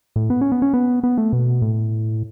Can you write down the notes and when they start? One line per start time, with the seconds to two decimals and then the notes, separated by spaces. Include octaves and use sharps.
0.16 A2
0.30 B3
0.41 C#4
0.52 B3
0.62 C#4
0.74 B3
1.04 B3
1.18 A3
1.33 B2
1.62 A2